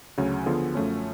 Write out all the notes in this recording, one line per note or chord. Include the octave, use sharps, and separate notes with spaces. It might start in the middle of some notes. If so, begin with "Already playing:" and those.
D2 C#3 F#3 C#4
D3 F3 B3 F4 G#4
F#2 F3 A3 C#4